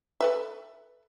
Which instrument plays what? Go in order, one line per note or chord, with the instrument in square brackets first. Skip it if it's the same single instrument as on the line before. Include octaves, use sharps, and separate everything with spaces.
[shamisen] A4 B4 E5